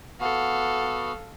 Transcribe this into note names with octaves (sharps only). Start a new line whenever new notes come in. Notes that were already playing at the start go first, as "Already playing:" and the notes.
B3 F#4 A4 F5